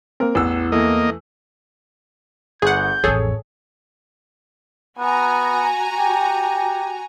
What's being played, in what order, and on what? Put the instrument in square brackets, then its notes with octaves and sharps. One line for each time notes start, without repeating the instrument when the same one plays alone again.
[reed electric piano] A#3 C4 [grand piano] A#4
[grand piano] A1 E6 [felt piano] E2 [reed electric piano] B3 F#5
[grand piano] E3 A3 [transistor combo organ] A#3 D#5
[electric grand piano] G1 [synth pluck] G#4 F#5 [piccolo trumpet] G6
[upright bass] A1 F2 [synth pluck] G#4 A4 [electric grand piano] C#5
[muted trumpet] B3 [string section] F#4 G#5 A#5
[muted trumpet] G4